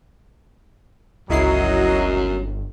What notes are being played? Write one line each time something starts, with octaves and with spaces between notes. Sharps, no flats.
G1 C#2 F#2 F#3 E4 D#5 C7